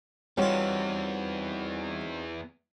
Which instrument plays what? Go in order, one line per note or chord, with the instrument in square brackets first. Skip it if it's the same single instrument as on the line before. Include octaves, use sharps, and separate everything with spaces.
[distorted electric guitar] E2 E3 [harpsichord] G3 F4 [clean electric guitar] C4 D#4 F#4 [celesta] C#5